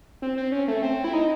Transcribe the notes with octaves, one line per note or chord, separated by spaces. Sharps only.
C4
C4
C#4
A3
C4
E4
D#4